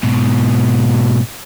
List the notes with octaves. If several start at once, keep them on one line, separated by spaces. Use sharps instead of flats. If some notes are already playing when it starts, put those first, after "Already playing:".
G#2 B2